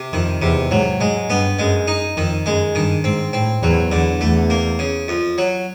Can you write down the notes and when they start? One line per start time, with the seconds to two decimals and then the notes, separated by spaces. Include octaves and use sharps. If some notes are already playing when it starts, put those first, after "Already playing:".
Already playing: C3
0.13 F2 D#3
0.42 E2 C3
0.71 G#2 F#3
1.00 G#2 G#3
1.29 G2 B3
1.59 F#2 G#3
1.88 D#4
2.17 F2 D#3
2.46 F#2 G#3
2.75 G2 D#3
3.04 G#2 C4
3.33 A2 C4
3.62 E2 F#3
3.92 E2 D3
4.21 E2 A3
4.50 A#3
4.79 C#3
5.08 F2
5.38 F#3